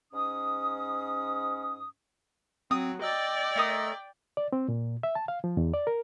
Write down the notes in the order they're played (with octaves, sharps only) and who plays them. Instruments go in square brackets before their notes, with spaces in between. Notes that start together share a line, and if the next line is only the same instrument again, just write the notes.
[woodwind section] G#2 C#4 D#6
[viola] F#3 [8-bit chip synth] C4 [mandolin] D#6
[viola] D5 G5 [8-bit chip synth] D#5 E6 A6
[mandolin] A3 A#4 D#6
[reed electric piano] D5
C4
A#2
E5
A5
F5
F3
E2
D5
A#4